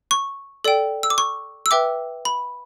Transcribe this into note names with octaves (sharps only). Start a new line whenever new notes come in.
C#6
A4 D5 G5
E6
D6
C#6
E6
B4 E5 G5 D6
B5